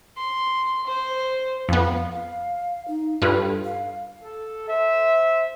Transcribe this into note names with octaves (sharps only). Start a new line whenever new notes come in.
C6
C5
F2 B3 F5
D#4
G2 F4 A4 B4
F5
A4
C5 E5